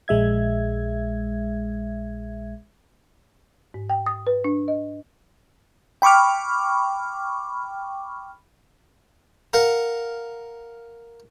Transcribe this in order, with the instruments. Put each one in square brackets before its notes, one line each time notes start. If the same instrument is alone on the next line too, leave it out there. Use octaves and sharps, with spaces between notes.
[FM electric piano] A#1 G#3 E5 G#6
[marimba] G#2
G5
D#6
B4
D4
D#5
[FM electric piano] G5 B5 C#6 D6 F6
[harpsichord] A#4 F5 F#5